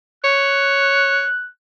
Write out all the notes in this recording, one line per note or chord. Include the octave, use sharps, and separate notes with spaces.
C#5 F#6